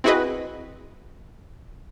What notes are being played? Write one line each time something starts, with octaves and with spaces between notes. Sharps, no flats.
C4 E4 F#4 G#4 B4 D#5